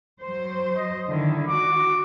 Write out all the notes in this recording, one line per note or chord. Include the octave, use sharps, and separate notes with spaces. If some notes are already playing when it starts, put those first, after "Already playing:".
F#3 C5
D#5
D3 D#3 E4
F#4 D6